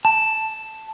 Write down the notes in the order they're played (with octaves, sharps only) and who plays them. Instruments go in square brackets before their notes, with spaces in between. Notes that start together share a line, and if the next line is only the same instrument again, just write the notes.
[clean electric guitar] A5